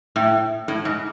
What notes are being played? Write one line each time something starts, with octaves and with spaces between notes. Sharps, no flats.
A2
A2
G#2